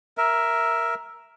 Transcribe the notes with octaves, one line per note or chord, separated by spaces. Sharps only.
A#4 E5